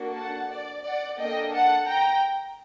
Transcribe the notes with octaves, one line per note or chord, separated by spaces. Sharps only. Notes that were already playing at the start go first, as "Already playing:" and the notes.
Already playing: A#3 D4 F#4 A4
F#5 A5
D5
D5 F#5
A#3 D4 A4 D#5 G5
F#5 A5
G5 A#5